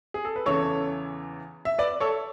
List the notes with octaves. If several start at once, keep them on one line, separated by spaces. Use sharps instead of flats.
G#4
A4
B4
E2 C#3 E3 A4 C#5
E5
B4 D5
A4 C#5